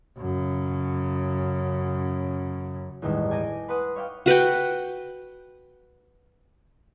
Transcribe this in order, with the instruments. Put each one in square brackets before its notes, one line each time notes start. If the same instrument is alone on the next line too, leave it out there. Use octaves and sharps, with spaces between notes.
[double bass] F#2 C#3
[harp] A1 E2 G2 D#3 G#3 E5
G#5 A5 D6 G6 A#6 D#7
B4 F#5 A5 C6 D#6 F#6
C#5 E5 F5 G5 D6
[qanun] F#4 B4 F#5 G5